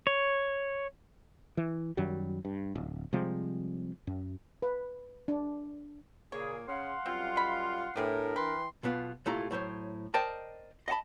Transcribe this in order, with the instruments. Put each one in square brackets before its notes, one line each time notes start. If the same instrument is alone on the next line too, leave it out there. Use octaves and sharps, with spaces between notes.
[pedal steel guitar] C#5
[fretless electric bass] E3
F#2 D#3 F#3 G3
G2
D1
C3 F3 G3 G#3
F#2
[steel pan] B4
D4
[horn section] A#2 A#3 [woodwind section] C#3 G#4 [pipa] C#5
[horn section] C#3 [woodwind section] F5 F#5 C6
[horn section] F#2 G3 F4 [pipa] C4
[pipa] G#3 B5
[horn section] A2 [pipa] B3 G4 G#4 [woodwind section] D4 A#4
[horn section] E3 G5 C6 [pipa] B4
[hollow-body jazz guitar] B1 B2 B3 F4
C2 A#2 A3 E4 F4 A#5
A2 F#3 C5 C#5
A#4 C5 D5 D#5 G5 A5
D#5 F5 F#5 A5 B5